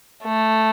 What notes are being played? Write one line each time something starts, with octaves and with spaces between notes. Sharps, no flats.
A3